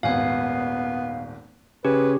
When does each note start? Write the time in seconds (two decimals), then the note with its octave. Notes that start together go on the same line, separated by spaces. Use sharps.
0.03 D#1 G#1 B3 F5 G#5
1.85 C#3 C#4 G4 G#4 B4